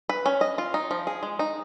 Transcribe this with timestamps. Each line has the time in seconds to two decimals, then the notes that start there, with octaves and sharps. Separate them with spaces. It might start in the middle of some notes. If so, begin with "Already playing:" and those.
0.09 B4
0.26 C#4
0.41 D#5
0.58 F4
0.74 D#4
0.91 F3
1.07 G#4
1.23 G#3
1.39 D#4